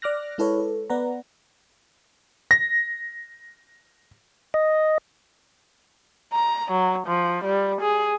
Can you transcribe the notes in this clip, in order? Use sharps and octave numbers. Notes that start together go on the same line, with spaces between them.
D5 D6 F6 F#6 A#6
G#3 E4 A4 B4 C#5
A4
B3 B4 D5 F#5 A#5
A#6
D#5
A#5
F#3
F3
G3
G#4